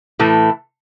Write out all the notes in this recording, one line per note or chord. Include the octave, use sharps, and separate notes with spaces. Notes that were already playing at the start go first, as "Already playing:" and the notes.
A2 E3 A3